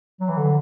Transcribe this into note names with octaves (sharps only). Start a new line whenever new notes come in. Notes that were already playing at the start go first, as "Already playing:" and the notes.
F#3
E3
D3